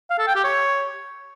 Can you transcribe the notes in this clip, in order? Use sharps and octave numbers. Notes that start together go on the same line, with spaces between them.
F5
A4
G5
G4
C#5